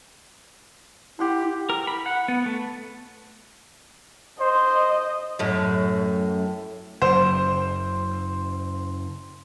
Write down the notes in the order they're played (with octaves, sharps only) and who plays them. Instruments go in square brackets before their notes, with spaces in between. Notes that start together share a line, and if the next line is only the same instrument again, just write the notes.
[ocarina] E4 [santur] G4 F#5 C6
[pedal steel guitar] A#4
B5
F#5
B3
A3
[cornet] C5 [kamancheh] D#5
[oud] F#2 A2
[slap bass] F#1 [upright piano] C5